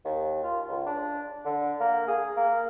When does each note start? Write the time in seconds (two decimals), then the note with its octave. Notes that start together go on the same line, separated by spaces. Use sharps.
0.05 D#2
0.43 F4
0.68 C#2
0.86 D4
1.45 D3
1.80 A#3
2.08 G#4
2.37 A#3